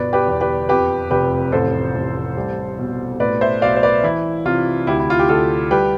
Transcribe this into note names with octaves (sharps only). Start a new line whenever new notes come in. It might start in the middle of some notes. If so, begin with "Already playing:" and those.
Already playing: G1 B2 B4 D5
G4 B4
E2
G4 B4
F2 G4 B4
F1 G4 B4
A1 A4 C5
A1
G3
B2
A2 B4 D5
C5 E5
B1 D5 F5
C5
B4 D5
E3 E4
C3 F4
D2 E4 G4
E4
F4
G4
D2 F4 A4
G3 G4 B4